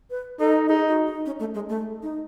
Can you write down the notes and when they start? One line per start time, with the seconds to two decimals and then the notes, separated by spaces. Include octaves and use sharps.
0.10 B4
0.39 D#4 A4
0.68 D#4 G#4
0.88 F#4
1.07 D#4
1.26 C#4
1.40 A3
1.55 G#3
1.69 A3
2.02 D#4